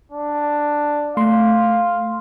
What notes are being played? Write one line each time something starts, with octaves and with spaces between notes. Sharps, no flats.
D4
A3 F5 C6